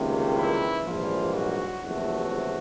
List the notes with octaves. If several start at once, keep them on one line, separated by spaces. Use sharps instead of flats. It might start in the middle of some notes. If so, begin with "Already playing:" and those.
Already playing: C#2 C3 D#3 G3 A#3
E3 E4
A#1 G#2 E3 F3 G3 A#3 F4
F#3 F#4
F#1 E2 C3 F3 F#3 A3 F#4